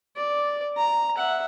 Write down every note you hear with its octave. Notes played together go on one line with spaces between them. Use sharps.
D5
A#5
E5 F#5